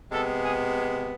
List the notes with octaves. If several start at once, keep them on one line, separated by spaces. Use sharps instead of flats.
C3 G#3 B3 A4
G#4